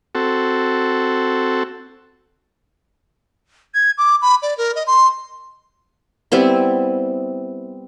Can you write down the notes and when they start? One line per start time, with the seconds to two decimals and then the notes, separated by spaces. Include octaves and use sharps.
0.15 C4 F#4 A4
3.74 G#6
3.98 D6
4.22 B5
4.42 D5
4.58 A#4
4.76 D#5
4.87 C6
6.32 G3 B3 C4 E4